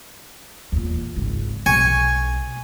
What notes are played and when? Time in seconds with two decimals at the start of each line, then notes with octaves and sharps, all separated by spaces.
0.72 E2 A#2
1.16 G#1 C#2
1.66 B1 G#5 C#6